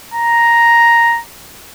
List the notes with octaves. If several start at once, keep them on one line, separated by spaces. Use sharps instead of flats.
A#5